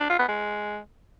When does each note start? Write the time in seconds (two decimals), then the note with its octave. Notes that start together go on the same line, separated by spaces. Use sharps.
0.01 D4
0.10 F4
0.19 B3
0.28 G#3